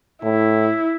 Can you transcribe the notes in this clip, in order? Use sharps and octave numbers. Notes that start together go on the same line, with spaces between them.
A2 E4